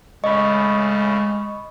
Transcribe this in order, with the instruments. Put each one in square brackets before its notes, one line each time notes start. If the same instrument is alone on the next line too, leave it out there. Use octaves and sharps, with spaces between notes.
[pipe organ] A2 C#3 [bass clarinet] G#3 [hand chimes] D#5 [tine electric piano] B5 C#6